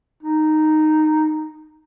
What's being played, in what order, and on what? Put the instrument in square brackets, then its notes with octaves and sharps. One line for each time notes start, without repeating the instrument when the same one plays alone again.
[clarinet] D#4